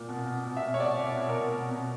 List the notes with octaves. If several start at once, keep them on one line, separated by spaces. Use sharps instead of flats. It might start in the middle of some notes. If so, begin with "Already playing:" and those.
Already playing: A#2
B2
B2
B2
E5
B2
C#5
B2 D5
B2
E5
B2
A#4
B2
B2
B2